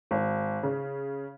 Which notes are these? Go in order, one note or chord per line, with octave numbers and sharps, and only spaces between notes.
G#1
C#3